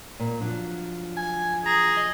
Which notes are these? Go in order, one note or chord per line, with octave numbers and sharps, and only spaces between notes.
A#2
F3 F#3 D4
G#5
G#4 A#5
D#5